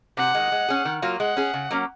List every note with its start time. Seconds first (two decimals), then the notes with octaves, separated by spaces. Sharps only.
0.17 C3 F#5
0.34 D#3 G#3
0.52 G#3
0.69 C#4 G#4
0.85 D#3
1.02 F#3 A#3 F4
1.19 G#3 F#5
1.37 C#4 G#4
1.54 C#3
1.71 F#3 A#3 C#4